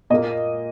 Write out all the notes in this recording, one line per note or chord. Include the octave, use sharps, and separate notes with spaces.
A#2 A#3 D#5